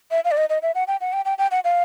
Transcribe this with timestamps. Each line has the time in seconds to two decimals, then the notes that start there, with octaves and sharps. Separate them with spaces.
0.11 E5
0.25 F5
0.31 D5
0.37 D#5
0.50 D#5
0.62 E5
0.75 F#5
0.88 G5
1.01 F#5
1.13 G5
1.25 G5
1.38 G5
1.51 F#5
1.64 F5